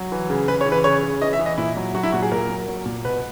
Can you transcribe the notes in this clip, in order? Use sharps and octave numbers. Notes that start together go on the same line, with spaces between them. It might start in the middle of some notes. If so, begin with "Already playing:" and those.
Already playing: F#3
E3
C#3
C#3 B4
C#5
E3
B4
C#3 C#5
C#3
E3 D#5
E5
E3
D#5
A#2 E4
F#3
F#3 F#4
E4
A#2 F#4
G#4
A#2 A#4
F#3
F#3
A#2
B2 B4